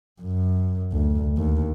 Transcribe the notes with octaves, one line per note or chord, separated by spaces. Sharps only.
F#2
D2
D#2